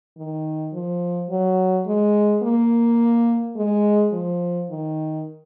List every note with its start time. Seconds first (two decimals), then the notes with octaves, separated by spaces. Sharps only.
0.17 D#3
0.73 F3
1.30 F#3
1.87 G#3
2.43 A#3
3.56 G#3
4.13 F3
4.70 D#3